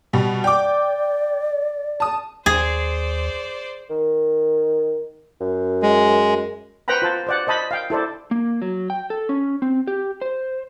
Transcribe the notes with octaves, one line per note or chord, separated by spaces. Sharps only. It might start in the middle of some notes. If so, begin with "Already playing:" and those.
B2 G3
D5 G5 D6
A5 D#6
D#2 G#4 C5 D5
D#3
F#2
G#3
B4 C5 F#5 G5 A#5 B5
F4 C5 A5
C5 D5 F#5
C5 D#5 A5 B5
F5 G5
E4 A4 C5 D5
A#3
F#3
G5
A4
C#4
C4
G4
C5